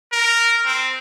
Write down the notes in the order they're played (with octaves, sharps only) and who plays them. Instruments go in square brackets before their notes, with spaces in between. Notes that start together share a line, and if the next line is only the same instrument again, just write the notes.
[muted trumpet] A#4
C4